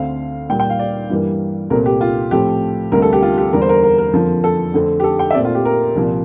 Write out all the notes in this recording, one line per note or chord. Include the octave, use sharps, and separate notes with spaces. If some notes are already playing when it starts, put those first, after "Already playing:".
Already playing: D2 D3 A3 C4 F5
A#2 G3 A#3 G5
G5
F5
D5
G2 E3 G3 A#3
C2 A#2 A3 C4 A#4
G4
F4
A2 F3 A3 C4 G4
D2 C3 G3 A#3 A#4
A4
G4
F4
G4
E2 D3 G3 A#3 A#4
C5
A#4
A#4
A#4
F2 D3 F3 A#3
A4
F2 D3 A3 C4
G4
A4
G5
E5
A#2 A3 C4 D5
F4
G4
A#4
C2 A#2 F3 A#3